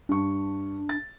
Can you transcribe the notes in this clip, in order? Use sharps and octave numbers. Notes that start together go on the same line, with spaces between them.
G2 D4 C#6
A6